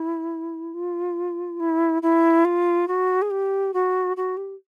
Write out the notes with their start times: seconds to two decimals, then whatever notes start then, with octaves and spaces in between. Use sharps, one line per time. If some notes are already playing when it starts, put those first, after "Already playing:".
Already playing: E4
0.74 F4
1.60 E4
2.02 E4
2.45 F4
2.88 F#4
3.22 G#4
3.31 G4
3.74 F#4
4.17 F#4
4.37 G4